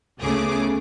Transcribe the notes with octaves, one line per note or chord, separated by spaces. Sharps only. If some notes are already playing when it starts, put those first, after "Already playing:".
D2 C#3 A3 B3 G#4 D6